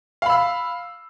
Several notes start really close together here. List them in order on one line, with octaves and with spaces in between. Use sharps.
F5 B5 E6